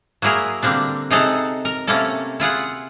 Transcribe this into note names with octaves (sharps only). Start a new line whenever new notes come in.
F#3 A#3 E4 G#4 A#4
D3 G3 A#3 C4 D4
C3 D#4 G#4 A4 E5 F#5
A#4
C3 A3 A#3 C#4 E4 A4
E4 F4 G#4 F#5